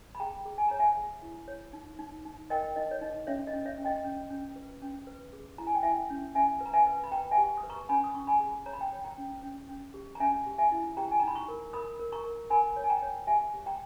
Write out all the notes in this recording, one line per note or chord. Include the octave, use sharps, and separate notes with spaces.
B5
G#4 G5 A#5
G#4
G#5
C#5 A#5
E5 G#5
G#4
E4
C#5
D#4
D#4
D#4
A#4 D#5 G5
D#4 D#5
C#5
D#4 D#5
C#4 C#5 E5
D#5
C#4
C#5 E5
C#4
D#5 G5
C#4
C#4
B4
C#4
B4
G#4
E4 A#5
G#5
G5
E4 E5 G#5
C#4
C#4 E5 G#5
B4
A#5
E5 G#5
B4
B5
B4 G5 A#5
E5 G#5
G4
D#6
B4
A#5 C#6
C#4 G#5 B5
D#6
C#4 C#6
G#5 B5
G#4
C#5 A#5
B5
G5 A#5
C#5
G5 A#5
C#4
C#4
C#4
G4
A#5
C#4 E5 G#5
G4
E5 G#5
E4
G4 G5 A#5
G#5
A#5
D#4 B5
A#5 C#6
A#4
A#4 B5 D#6
A#4
A#5 C#6
A#4
A#4 G#5 B5
C#5
G#5
G5 A#5
C#5
G4 E5 G#5
G4
G5 A#5